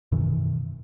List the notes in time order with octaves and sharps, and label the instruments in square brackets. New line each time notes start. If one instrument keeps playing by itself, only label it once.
[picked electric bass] F#2 B2 D#3 E3